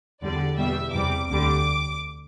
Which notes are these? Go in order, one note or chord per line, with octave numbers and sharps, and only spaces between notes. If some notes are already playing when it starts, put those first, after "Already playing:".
E2 D3 G3 D5
E2 B2 G3 E5
E2 C3 G3 D6
D2 D3 G3 D6